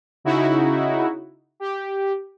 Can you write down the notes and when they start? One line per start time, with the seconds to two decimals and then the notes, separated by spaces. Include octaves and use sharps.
0.24 C#3 D#4 E4 F#4
1.60 G4